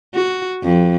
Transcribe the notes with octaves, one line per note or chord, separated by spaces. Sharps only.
F#4
F2